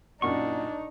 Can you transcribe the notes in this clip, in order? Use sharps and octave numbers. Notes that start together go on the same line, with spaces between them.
F#2 A#2 D4 D#4 F#4 C#6